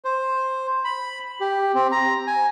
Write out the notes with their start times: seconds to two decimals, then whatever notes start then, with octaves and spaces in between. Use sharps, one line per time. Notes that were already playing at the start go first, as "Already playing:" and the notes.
0.05 C5
0.85 B5
1.41 G4
1.75 C4
1.92 A#5
2.27 G#5